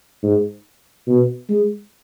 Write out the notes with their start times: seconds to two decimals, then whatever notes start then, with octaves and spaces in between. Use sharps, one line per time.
0.23 G#2
1.07 B2
1.49 G#3